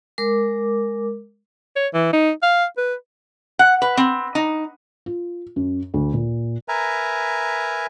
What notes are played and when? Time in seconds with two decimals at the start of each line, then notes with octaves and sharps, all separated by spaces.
0.18 G#3 A#4 D6
1.76 C#5
1.94 E3
2.13 D#4
2.43 F5
2.77 B4
3.59 F#5
3.82 B4
3.97 C4
4.35 D#4
5.06 F4
5.56 F#2
5.94 D2
6.14 A#2
6.68 A#4 B4 E5 G#5 A#5